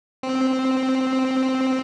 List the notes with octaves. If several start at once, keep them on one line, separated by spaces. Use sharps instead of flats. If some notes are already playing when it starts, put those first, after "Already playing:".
C4